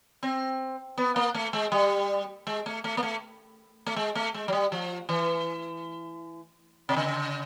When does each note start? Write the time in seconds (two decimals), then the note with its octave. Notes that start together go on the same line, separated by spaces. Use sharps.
0.23 C4
0.98 B3
1.16 A#3
1.34 A3
1.53 G#3
1.72 G3
2.47 G#3
2.66 A3
2.84 A3
2.97 A#3
3.03 A3
3.86 A3
3.96 G#3
4.15 A3
4.34 G#3
4.48 F#3
4.53 G3
4.72 F3
5.09 E3
6.89 C3
6.96 C#3